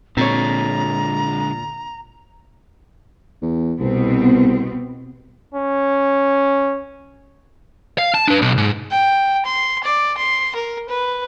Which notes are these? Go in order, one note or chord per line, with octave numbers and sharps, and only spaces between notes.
A#2 D3 G#3 C4 C#5 A#5
E2
C2 B2 B3 C4
C#4
F5
A5
D4 B4
B1
G#2
G5
C6
D5
C6
A#4
B4